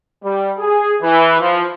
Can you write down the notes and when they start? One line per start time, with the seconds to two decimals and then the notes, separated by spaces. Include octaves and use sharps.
0.22 G3
0.58 G#4
1.02 E3
1.40 F3